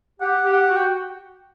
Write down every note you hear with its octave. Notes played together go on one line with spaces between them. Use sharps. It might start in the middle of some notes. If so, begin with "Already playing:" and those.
G4 F#5
G4
F#5
F#4
G5